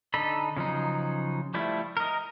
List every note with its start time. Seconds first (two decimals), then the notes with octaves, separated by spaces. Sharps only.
0.14 D3 D#4 A4 B5
0.57 C#3 F3 F#3 D#4
1.54 F3 G3 A3 E4
1.97 A#4 D#5